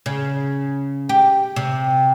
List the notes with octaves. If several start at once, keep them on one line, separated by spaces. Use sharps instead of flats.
C#3
G4
C3